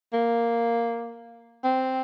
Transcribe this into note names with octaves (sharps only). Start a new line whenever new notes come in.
A#3
C4